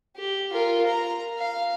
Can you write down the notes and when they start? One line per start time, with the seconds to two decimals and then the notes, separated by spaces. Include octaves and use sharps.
0.17 G4
0.53 F4 A#4
0.87 A#5
1.38 F5